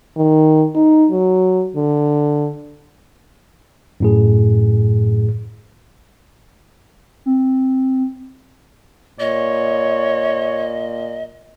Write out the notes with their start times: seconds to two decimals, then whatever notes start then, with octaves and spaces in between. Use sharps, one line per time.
0.17 D#3
0.75 D#4
1.11 F#3
1.76 D3
4.00 F#2 A2 G#4
7.26 C4
9.20 A#2 C#5 D#5